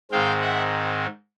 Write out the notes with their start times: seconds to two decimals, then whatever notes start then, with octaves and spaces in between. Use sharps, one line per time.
0.11 G#2 D#3 G#3 C4 F5 G5
0.41 E5 F#5